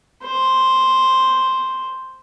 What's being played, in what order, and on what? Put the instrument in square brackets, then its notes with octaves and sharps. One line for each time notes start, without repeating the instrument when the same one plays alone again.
[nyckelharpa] C5